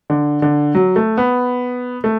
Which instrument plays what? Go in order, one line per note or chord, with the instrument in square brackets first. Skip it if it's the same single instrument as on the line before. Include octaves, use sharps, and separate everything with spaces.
[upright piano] D3
D3
F#3
A3
B3
A3